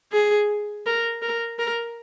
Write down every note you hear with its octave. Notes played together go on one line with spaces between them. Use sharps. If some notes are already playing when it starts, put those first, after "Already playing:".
G#4
A#4
A#4
A#4